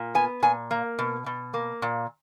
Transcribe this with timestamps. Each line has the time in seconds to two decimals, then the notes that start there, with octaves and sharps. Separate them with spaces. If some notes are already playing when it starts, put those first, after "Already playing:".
Already playing: A#2
0.15 B3 G#5
0.42 A#2 G#5
0.71 A#3
0.99 B2
1.26 B2
1.54 A#3
1.82 A#2